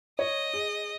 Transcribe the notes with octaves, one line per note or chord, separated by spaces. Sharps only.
C#5 D#5
G#4